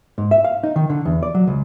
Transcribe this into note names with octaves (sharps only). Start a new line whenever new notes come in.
G#2
E5
F5
D#4
D#3
D3
E2
D5
F#3
C#2